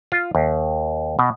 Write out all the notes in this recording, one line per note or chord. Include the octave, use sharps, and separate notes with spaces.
F4
D#2
B2